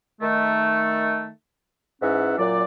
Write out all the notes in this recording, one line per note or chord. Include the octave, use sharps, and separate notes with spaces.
D#3 A3
G#2 E3 C#4 E5 F#5
F#2 A#2 F#3 D5